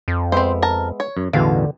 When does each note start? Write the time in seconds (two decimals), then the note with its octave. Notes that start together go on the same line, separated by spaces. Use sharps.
0.08 F2
0.32 G#3 B3 C4 C5 E5
0.62 A#4 A5
1.00 C#5
1.17 F#2
1.33 A1 E2 B2 D3 F5